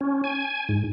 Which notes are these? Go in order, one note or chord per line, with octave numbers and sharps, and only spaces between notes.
C#4
G#5
G#2